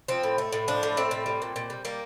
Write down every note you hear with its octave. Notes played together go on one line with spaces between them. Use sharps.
F3 C4
A2
A3
A2
F3 D4
A2
A3 C4
A2
G3
A#2
A#2
G3
G3 A#3